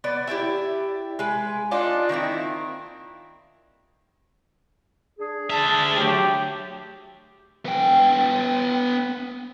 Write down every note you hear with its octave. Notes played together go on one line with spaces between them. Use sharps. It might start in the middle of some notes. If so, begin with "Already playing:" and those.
B3 D5
E4 G4 D5 E5
G#3 B4
D4 D#4 F4
D#3 A#3 C4 E4
D4 G#4
D3 E5 A5
F#3 A3 G4
B3 G5